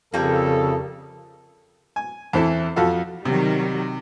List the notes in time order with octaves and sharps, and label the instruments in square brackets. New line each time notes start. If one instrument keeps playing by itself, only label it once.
[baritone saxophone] F2 [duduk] C#3 [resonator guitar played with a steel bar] G3 A#3 [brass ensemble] A4
[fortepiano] G#5
E2 E3 C4 E4 A4
F2 F4 F#4 A4 F5
[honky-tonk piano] C3 [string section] D#3 F#3 G3